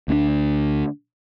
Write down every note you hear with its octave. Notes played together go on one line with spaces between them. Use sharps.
D2 C4 D4